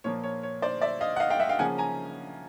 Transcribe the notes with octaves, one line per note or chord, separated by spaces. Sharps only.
A#2 F3 A#3 C#5
C#5
C#5
C5 D5
D5 E5
D#5 F5
F#5
D#5 F5
F5 G5
E5 F#5
F5 G5
C#3 F3 A#3 C#4 F#5 G#5
G#5 A#5